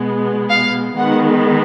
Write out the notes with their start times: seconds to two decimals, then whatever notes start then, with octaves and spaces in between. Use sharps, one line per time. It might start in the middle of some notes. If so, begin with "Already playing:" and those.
Already playing: B2 G#3 B3
0.50 F5
0.96 D#3 G#3 B3 F#5